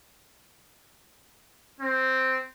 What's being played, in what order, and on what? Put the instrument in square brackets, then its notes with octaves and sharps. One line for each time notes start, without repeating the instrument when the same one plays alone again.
[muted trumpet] C4